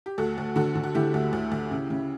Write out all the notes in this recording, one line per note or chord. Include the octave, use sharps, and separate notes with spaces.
G4
D2 F#4 A4
D2
D3 F#4 A4
D3
F#4
D3 E4 G4
D2
D2
D2
C#3
C#3